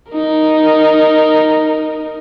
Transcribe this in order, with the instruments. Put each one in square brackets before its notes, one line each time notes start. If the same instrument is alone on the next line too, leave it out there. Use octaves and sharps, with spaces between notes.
[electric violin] D#4 A#4